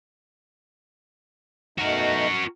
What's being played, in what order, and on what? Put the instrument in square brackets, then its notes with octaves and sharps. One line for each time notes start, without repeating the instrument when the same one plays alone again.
[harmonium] B2 A3 D#4 [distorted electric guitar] F#4 A#4